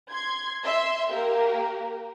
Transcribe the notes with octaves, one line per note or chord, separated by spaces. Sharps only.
C6 G#6
E5 C6
A#3 G4 A#4